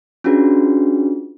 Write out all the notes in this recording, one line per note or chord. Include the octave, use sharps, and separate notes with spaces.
C#4 D4 F4 F#4 G#4 B4